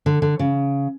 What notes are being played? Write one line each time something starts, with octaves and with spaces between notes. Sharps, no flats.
D3
D3
C#3